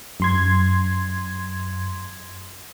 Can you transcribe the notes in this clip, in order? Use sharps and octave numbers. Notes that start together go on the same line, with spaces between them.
F#2 C6 G#6